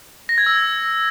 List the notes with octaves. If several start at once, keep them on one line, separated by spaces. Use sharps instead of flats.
A#6
G#6
E6